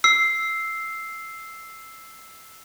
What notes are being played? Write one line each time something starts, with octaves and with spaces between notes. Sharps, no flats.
E6 C7